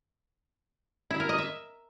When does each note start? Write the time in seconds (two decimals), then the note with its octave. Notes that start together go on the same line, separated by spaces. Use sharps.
1.11 E4
1.20 A#4
1.29 D#5
1.38 E5